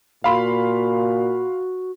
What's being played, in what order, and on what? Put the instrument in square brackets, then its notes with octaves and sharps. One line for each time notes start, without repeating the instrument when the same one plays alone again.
[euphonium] A#2 [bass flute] F#4 [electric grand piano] F5 B5 C6